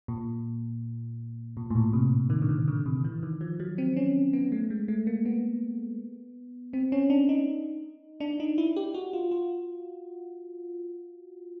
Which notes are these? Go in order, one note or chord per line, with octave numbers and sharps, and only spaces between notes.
A#2
A#2
A2
A#2
C3
D#3
D3
D#3
D3
C3
E3
D#3
F3
F#3
C4
C#4
B3
A3
G#3
A3
A#3
B3
C4
C#4
D4
D#4
D4
D#4
E4
G4
F#4
F4
F4